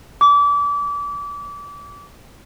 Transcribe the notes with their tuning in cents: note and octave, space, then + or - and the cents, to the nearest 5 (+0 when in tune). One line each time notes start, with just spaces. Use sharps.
D6 -30